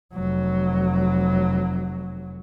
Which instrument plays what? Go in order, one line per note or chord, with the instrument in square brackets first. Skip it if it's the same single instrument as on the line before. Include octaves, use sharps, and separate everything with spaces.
[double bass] F1 F#3